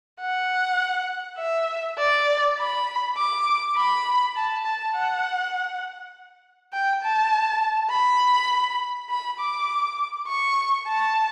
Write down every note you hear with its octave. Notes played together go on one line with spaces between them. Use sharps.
F#5
E5
D5
B5
D6
B5
A5
A5
F#5
G5
A5
B5
B5
D6
C#6
A5